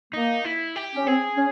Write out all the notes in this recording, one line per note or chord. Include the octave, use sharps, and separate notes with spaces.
A#3 D#4
E4
G4
C#4
C4 G#4
C#4